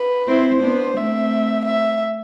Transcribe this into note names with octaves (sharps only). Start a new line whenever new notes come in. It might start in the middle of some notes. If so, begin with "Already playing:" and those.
Already playing: B4
C4 E4 C5
B3 D4
A3 C4 E5
E5